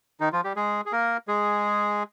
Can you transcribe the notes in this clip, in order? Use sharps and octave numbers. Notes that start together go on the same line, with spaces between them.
D#3 D#4
F3 F4
G3 G4
G#3 G#4
G#4
A#3 A#4
G#3 G#4